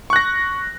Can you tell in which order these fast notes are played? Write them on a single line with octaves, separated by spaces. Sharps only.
C#6 F#6 A#6